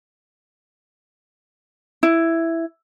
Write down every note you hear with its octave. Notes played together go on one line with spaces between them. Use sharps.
E4